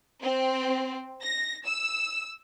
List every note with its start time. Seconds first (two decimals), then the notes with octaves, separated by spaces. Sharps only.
0.23 C4
1.22 A#6
1.65 E6